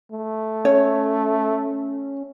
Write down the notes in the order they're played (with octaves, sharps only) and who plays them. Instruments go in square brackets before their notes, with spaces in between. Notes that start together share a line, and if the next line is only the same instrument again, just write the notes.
[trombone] A3
[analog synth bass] C#4 [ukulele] C#5